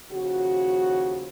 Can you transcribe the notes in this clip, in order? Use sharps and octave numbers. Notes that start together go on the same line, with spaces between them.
D#2 C#3 F3 F#4